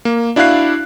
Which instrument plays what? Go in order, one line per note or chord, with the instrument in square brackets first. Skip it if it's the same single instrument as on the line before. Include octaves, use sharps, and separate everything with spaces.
[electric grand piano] A#3
D4 E4 F#4 F5 F#6 C7